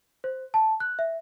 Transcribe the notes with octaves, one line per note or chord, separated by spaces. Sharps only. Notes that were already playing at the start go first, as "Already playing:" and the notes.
C5
A5
F#6
E5